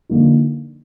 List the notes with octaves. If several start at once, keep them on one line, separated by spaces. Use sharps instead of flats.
D3 F3 A#3 D#4